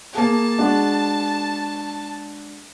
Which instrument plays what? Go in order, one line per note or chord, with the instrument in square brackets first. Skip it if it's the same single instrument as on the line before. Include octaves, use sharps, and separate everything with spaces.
[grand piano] A#3 G#4 [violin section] A5
[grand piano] G#3 D4 F#4